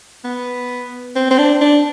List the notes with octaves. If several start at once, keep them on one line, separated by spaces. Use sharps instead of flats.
B3
C4
C4
D4
D4